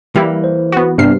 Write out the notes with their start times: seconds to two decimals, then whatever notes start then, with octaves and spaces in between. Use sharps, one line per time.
0.16 E3 G3 A#3 E4
0.44 C5
0.72 B3 F#4
0.98 G2 C3 B3 D4 F6 C7